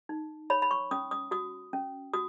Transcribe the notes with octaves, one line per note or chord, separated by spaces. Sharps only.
D#4
C#5 B5
B5
C#6
C#4 D#6
D#6
F#4 D#6
C#4
F#4 D#6